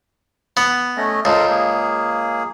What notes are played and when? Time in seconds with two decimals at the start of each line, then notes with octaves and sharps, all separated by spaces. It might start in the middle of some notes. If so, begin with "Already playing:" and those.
0.57 B3
0.97 A3 C#4 D#5
1.25 C#2 A4 A#4 C5
1.50 A#3 G#4